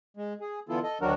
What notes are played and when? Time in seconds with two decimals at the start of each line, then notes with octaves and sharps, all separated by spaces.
0.17 G#3
0.41 G#4
0.69 D3 E3 B3 E4 F4 A4
0.83 A4 D#5
1.01 D2 D#3 F#3 D4 F#4 A#4